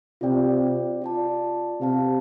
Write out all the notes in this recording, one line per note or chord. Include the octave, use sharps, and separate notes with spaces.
C3 F4 D5 G5
F4 D5 A5
C3 G4 F5 A5